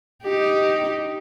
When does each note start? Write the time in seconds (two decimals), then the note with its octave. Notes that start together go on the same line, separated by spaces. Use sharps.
0.24 D#4 G4